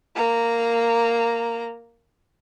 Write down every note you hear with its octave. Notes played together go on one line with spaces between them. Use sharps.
A#3 A#5